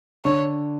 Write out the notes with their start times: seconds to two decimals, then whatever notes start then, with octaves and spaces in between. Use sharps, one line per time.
0.25 D3 C#5